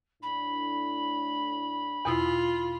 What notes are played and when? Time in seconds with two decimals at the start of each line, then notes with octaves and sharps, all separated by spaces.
0.22 A2 D4 B5
2.05 E2 B2 E4 F4